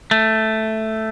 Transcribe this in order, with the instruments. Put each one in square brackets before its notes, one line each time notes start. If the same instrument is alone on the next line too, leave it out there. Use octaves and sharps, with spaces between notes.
[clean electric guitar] A3